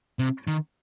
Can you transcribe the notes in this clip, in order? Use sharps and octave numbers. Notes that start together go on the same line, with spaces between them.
C3
D#3